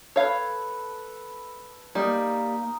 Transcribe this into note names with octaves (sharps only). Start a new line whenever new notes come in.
A4 B4 C#5 F5
G3 A#3 D#4 A#4 D#5